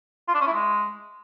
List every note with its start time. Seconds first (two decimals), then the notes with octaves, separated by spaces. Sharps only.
0.28 F4
0.34 D4
0.41 C#4
0.47 E4
0.53 G#3